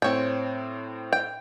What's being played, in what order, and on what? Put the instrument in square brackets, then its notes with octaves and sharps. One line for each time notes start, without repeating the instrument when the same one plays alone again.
[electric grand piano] A2 C4 [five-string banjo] C#5 G5
[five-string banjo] G5